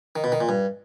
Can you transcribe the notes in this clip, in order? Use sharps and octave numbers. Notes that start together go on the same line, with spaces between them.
D#3
B2
D#3
A#2
G2